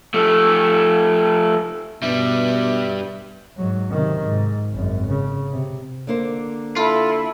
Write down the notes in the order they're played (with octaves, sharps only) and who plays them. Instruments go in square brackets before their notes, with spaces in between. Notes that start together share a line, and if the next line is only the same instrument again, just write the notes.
[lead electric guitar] F3 A3
[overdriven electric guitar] G2 G3 [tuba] B2 [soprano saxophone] E5
[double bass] G#2 F#3
C3 D#3
G#2
G#1 F#2
C#3
C3
[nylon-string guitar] D3 A#3 C5
[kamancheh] E4 [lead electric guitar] F4 [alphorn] A4